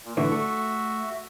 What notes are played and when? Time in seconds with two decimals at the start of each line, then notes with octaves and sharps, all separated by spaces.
0.05 A#2
0.17 A2 D3 E3 F#4 E5
0.32 A3